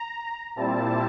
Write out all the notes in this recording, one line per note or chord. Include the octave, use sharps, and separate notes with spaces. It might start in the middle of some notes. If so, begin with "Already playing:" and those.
Already playing: A#5
A#2 G3 C4 E4 A5